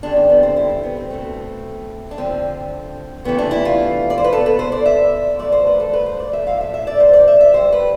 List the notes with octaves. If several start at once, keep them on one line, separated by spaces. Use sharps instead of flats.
E2 D3 G3 D4
C4
B3
C4
E4
C4
B3
C4
B2 A3
D4
F2 D3 F3 C4
E2 C3 E3 A3 B3
D4
E4
F4
D5
C5
B4
B2 B3 A4
B4
C5
D5
E5
G2 F3 A3 D5
C5
B4
A4
B4
C5
D5
E5
A2 F3 A3 F5
E5
E5
D5
C5
D5
E5
E5
F2 C3 G3 C5
B4